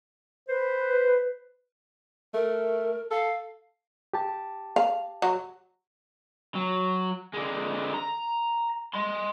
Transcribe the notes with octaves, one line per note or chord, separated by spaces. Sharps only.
B4 C5
A3 A#4
A4 F5
G4 A5
F5
F#3
F#3
D3 G#3
A#5
D#5 C6